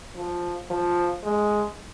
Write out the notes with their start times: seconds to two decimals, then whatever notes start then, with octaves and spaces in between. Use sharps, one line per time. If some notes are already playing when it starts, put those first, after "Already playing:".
0.16 F3
0.70 F3
1.23 G#3